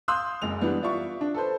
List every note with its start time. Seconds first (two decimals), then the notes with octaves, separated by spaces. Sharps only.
0.08 F5 C6 D#6 E6 F#6 G6
0.42 F#1 G#3 F7
0.61 E3 G3 B3 D4
0.82 F4 D5 E5 F5 C#6
1.21 D4
1.35 A4 B4 C5